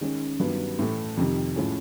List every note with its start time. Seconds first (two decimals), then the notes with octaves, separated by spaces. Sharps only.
0.01 D#3 G#3 C#4
0.39 G2 D#3 F#3 B3
0.79 A2 E3 A3
1.17 F2 C3 D#3
1.56 A2 F3 G#3 C#4